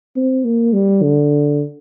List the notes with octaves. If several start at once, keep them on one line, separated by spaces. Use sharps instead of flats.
C4
A#3
G3
D3